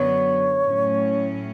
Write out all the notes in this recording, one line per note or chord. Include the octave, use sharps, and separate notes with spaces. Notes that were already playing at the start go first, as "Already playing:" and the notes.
Already playing: F#2 D3 F#3 B3 C#5
A2 F#3 C#4